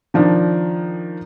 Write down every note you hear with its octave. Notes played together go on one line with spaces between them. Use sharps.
D#3 F3 D4